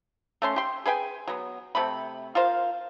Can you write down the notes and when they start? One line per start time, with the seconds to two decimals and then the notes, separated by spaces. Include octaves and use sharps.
0.42 A3 C#4 C6
0.56 G4 C6
0.86 G#4 B4 G5 G#5
1.28 F#3 B3
1.75 C3 A3 B5
2.35 F4 A#4 C5 F5